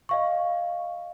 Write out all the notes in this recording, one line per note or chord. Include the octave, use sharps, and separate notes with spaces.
D#5 F5 C#6